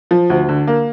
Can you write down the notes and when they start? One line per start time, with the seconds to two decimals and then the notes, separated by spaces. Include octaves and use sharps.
0.11 F3
0.30 D2
0.49 D3
0.68 A#3